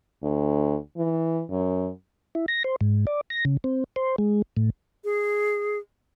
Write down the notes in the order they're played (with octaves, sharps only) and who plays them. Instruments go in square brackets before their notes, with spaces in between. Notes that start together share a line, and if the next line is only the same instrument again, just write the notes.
[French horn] D2
E3
F#2
[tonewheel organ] E4
A#6
C5
G#2
D5
A#6
C#3
C4
C5
G#3
A2
[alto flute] G#4